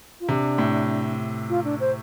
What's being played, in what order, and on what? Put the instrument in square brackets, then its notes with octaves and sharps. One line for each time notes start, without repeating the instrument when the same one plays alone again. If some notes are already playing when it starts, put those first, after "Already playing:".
[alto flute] F4
[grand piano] C3 [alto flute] D4
[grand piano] A2
[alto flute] F4
D4
C5